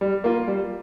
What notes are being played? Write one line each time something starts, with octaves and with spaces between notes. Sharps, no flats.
G3
A#3 F4
G3